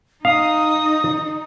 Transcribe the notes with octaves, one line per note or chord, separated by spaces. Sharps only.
D#4 F5 D#6